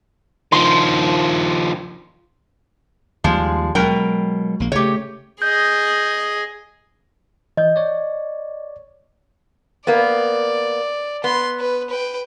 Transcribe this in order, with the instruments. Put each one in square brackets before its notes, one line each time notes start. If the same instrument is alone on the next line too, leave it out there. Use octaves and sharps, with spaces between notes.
[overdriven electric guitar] D#3 F3 [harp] C6
[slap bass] D#2 G3 [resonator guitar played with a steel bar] F3 G#3
[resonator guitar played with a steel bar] B2 A#4 G5 [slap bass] F#3 G#3
[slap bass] A#1 A#3
[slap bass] C#3 A3 [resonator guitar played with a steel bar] G4 C#5
[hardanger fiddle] G#4 D#5 [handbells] G6
[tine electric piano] E3 G6 [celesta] D#5
[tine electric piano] C#5 D5
[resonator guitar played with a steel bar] A#3 B3 [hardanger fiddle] D5
[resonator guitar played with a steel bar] B3 [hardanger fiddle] C6
[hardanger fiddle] B4
B4 G5